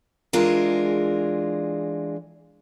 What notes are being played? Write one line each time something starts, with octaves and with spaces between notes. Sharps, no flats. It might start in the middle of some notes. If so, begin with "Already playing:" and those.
E3 G#3 D4 F4 G#4 A#4